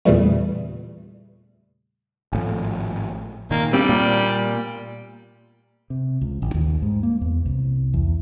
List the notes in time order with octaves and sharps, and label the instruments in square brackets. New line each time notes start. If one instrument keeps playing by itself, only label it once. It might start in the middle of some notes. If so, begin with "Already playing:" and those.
[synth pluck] E2 A#2 C#3 E3 G3 A3
[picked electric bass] G#1 A2 F3
[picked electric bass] A#2 D#3 [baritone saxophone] A#3
[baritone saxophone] G3 [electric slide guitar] C4 D4 G4
[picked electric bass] A#2 [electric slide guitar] A#3 D5
[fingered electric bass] C3
C#2
A1
D#2
G#2
A#3
E2
C2
E2